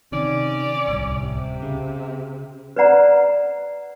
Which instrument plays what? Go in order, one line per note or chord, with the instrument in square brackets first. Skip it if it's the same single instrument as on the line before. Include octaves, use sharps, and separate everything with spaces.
[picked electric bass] C3 D#3 [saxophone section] C#4 D5
[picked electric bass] D1 C2
[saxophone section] C3
[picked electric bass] C#3
[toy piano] B4 C5 D5 F#5 A#5